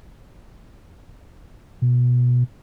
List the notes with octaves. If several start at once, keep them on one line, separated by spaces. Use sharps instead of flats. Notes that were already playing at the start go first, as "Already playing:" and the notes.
B2